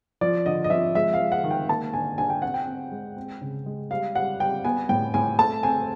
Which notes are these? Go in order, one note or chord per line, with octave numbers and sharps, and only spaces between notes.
F3 D5
D3 D#5
D#5
F3 E5
G#3 E5
F5
G#3
F#5
D#3
G5
A#3 A5
D3 G#5
D3 G#5
G5
C4 F#5
G5
C4
G#3
C4
C#3
G#3
G3 F5
G3 F#5
G3 G5
B3 G#5
A2 G5
A2 G#5
A3 A5
C4 G#5